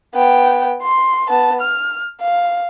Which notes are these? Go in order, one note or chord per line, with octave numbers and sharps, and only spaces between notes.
B3 G5
C6
B3 A5
F6
F5